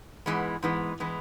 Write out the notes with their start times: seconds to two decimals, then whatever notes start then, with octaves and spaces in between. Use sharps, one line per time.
0.26 G#2 E3 G#3 B3
0.63 G#2 E3 G#3 B3
1.00 E3 G#3 B3